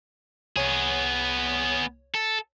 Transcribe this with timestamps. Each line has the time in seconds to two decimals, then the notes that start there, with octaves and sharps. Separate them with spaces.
0.56 C2 B3 G#4 C#5
2.15 A4